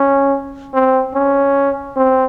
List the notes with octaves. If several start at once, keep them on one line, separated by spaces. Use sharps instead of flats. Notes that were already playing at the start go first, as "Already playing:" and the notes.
Already playing: C#4
C4
C#4
C4